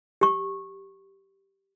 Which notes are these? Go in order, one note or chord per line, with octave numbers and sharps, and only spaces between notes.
G4 C#6